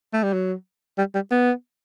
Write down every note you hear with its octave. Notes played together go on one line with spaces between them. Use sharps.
A3
G3
F#3
G3
G3
B3